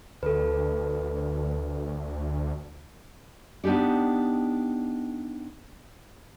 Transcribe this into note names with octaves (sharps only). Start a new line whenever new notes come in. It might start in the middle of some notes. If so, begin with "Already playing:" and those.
D2 A4 B4
B3 D4 D#4 G4 D5